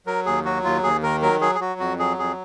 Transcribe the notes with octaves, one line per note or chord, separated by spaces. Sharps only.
F#3 A#4
D#2 G#4
F#3 F#4
D#2 F4
D#2 G#4
D#3 A#4
F#3 A#4
F#3 G#4
G#4
F#3 F#4
F2 F#4
F#3 G#4
F2 G#4